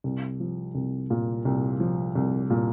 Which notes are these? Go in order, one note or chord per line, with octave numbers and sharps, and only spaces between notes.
C2
F3
C2
A#2
C2
F3
C2
A#2